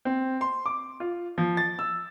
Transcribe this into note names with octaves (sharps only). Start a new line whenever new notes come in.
C4
C6
D6
F4
F3
A6
E6